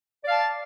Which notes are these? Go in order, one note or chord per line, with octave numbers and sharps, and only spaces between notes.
D5 F5 A5